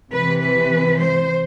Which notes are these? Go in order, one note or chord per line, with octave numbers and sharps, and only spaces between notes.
C3 E3 B4
B4
C5